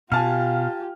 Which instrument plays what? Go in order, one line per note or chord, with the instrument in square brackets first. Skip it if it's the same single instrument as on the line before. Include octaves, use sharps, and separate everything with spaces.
[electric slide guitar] B2 [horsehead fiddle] F4 G4 [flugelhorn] F5 [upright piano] G#5 A5 F6